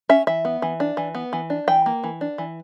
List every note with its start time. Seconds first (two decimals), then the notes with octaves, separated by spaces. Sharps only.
0.09 C#4 E5
0.27 E3 E5
0.45 B3
0.62 E3
0.80 D4
0.97 E3
1.15 B3
1.33 E3
1.50 D4
1.68 E3 G5
1.86 A#3
2.04 E3
2.21 D4
2.38 E3